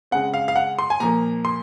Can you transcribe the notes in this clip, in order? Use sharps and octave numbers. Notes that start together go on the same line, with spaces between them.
C#3 G#3 C4 F#5
F5
F5
F#5
C6
G#5
A#2 F3 A#3 A#5
C6